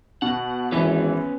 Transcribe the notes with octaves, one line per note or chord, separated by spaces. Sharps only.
B2 F#4 F#5
G#1 E3 B3 C#4